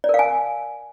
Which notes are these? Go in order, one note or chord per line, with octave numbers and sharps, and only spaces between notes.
D5
A#4
F5
G#5